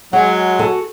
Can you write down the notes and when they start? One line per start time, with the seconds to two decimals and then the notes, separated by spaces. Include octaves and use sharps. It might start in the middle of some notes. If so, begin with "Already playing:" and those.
0.13 F#3 G#3 F#5
0.59 F#4 A4 G#5